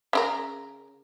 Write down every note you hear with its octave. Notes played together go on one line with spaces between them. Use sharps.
C#3 E4 A#4